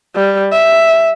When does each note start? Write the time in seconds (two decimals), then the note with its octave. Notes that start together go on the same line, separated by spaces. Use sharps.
0.16 G3
0.52 E5